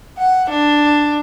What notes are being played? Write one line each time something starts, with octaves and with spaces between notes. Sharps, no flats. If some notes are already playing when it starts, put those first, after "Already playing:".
F#5
D4